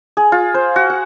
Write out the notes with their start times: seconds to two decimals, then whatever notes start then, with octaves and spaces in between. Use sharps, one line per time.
0.17 G#4
0.32 F4
0.54 C5
0.76 F#4
0.90 F#5